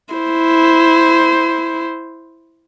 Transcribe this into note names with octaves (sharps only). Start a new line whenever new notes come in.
E4 C5